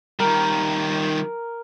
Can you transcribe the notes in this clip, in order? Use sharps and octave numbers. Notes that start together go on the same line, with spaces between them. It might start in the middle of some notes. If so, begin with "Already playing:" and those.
D#3 G3 A#4